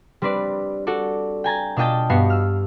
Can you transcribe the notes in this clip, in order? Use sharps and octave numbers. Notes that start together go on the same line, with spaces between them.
G3 C4 D4 B4 D5
F#4 A4 D5
G5 G#5 A#5 A6
B2 D4 F4 D#5 G5 A5
G2 B3 F#4 G4 C7 C#7
E6 F6